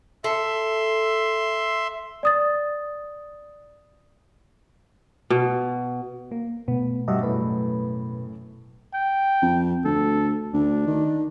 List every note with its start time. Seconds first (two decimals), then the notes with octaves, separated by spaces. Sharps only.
0.24 A4 E5 C6
2.23 D5 D#6 A6
5.30 B2
6.31 A#3
6.68 B2 A3 B3
7.08 G2 G3 F#4 D#5 E5
7.23 F#2 A2 B4
8.94 G5
9.42 F2
9.85 D2 A4
10.54 D2 D4
10.86 D#3